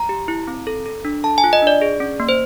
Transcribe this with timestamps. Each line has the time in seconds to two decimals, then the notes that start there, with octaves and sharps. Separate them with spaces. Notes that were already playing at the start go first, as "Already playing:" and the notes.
Already playing: A#5
0.09 G4
0.28 E4
0.47 C4
0.67 A4
0.86 A4
1.05 D4
1.24 A4 A5
1.38 G#5
1.44 F4
1.53 D#5
1.62 D4 D5
1.82 G#4
2.00 C#4
2.20 A#3
2.29 C5